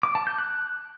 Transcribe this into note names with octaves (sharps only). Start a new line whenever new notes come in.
D6
A5
G6
F#6